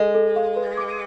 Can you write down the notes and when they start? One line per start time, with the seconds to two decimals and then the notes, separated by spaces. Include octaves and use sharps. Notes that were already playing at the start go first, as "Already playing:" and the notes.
Already playing: G#3 A4
0.15 A4
0.36 F5
0.56 B4
0.77 D6